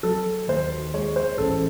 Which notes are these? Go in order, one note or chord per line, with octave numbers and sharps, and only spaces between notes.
F#3 A4
D#2 C5
G#3 C#5
C5
A1 A4